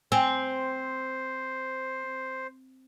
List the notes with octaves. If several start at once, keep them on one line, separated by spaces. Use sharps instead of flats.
C4 C5 G5 G#5